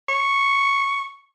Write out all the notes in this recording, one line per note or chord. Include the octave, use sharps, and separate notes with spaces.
C#6